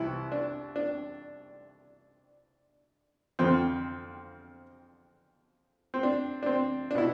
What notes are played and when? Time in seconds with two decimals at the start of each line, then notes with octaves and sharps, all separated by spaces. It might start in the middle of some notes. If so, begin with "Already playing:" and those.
Already playing: C2 C3 E3 E4
0.32 D4
0.76 D4
3.39 F2 D3 F3 C4
5.94 C4
6.03 D4
6.43 D4
6.46 C4
6.91 D4
6.95 B2 E4